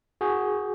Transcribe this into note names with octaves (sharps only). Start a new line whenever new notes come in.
F#4 G#4